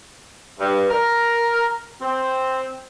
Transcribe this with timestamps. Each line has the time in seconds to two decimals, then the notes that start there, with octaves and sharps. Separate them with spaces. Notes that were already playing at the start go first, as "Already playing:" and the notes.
0.59 G2
0.90 A#4
2.01 C4